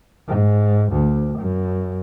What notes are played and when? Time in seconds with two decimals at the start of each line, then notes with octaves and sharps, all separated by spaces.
0.27 G#2
0.92 D2
1.39 F#2